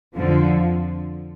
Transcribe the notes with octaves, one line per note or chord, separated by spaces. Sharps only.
F2 D3 F3